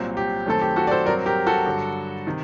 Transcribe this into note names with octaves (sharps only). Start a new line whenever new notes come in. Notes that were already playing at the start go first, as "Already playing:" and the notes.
Already playing: C2 A#2 F#3 C4
G4
F#2 D#3 A3 C4 A4
G4
F#4 A4
D5
A4 C5
G2 F#3 C4 A#4 D5
G4 A#4
F#4 A4
G2 D3 F#3
C3 D#3